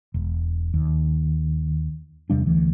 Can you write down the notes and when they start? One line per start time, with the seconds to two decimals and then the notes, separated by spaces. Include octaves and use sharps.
0.14 E1
0.74 D#2
2.30 E2 C3 G3 D4
2.46 D2 E3